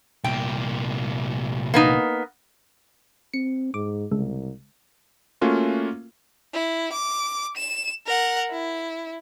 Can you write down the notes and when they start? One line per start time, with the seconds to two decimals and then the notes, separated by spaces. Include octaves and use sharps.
0.24 C2 A#2 G5
1.74 A#3 B3 D#4
3.34 C4 C#7
3.74 G#2 D6
4.12 C2 C#3 G#3
5.41 A3 A#3 C#4 F4 F#4
6.53 E4
6.93 D6
7.57 E7
8.07 A#4 F#5
8.51 E4